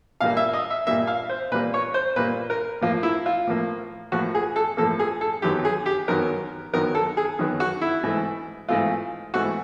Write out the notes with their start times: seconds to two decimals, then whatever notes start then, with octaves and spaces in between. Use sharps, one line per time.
0.20 A#2 G3 A#3 F5
0.37 E5
0.53 D#5
0.70 E5
0.87 A#2 G3 A#3 E5
1.07 F5
1.29 C5
1.52 A#2 G3 A#3 B4
1.74 C#5
1.94 C5
2.16 A#2 G3 A#3 B4
2.50 A#4
2.81 A2 F3 A#3 F4
3.03 E4
3.26 F4
3.47 A2 F3 A#3
4.12 A2 F3 A#3 F#4
4.35 G#4
4.56 A4
4.77 A2 F3 A#3 A4
4.99 G#4
5.21 A4
5.42 F#2 D#3 F#3 B3 G4
5.65 G#4
5.86 G4
6.08 F#2 D#3 F#3 B3 A#4
6.73 F#2 D#3 F#3 B3 A#4
6.95 A4
7.17 G#4
7.39 F#2 D#3 F#3 B3
7.60 F#4
7.81 E4
8.03 G#2 E3 A3
8.68 G#2 E3 A3 F4
9.34 G#2 E3 A3 F#4